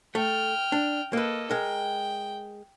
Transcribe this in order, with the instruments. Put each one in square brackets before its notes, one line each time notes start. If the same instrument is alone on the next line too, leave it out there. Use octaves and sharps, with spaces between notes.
[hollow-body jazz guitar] A3 [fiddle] G5 F6
[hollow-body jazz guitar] D4
[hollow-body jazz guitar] A#3 B4 [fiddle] A4 D#5
[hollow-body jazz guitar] G#3 A#4 [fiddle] G5